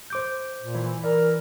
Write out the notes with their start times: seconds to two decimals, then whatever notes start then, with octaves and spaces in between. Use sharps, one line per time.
0.10 C5 D6 G6
0.59 A#2
0.75 E3
1.04 A#4 D5